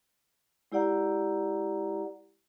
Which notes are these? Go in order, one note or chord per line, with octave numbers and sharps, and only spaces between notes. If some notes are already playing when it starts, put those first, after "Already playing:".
G#3 E4 G4 D5 F#5 A#5